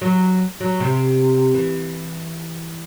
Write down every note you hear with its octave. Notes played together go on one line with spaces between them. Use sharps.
F#3
F#3
C3
E3